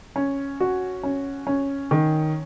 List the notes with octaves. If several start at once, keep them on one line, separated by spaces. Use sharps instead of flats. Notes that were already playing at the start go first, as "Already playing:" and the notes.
C#4
F#4
C#4
C#4
D#3